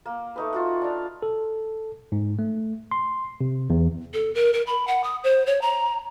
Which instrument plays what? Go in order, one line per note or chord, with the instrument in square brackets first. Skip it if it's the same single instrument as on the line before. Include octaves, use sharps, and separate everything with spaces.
[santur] A#3
A3 D#4 B4
F4 F#4 F#5
D4 F5
[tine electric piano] A4
G#2
A3
C6
C3
E2
[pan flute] A4
A#4
A#4
B5
F#5
D#6
C5
C#5
A#5